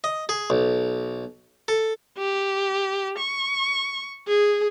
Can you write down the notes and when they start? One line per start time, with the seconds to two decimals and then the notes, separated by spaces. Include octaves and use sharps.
0.04 D#5
0.29 G#4
0.50 B1
1.68 A4
2.18 G4
3.18 C#6
4.28 G#4